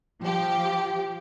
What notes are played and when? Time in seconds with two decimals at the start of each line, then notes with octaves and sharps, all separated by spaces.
0.22 F3 G4